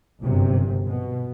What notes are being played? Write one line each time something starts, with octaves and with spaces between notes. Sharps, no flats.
G1 F#2 C3
B2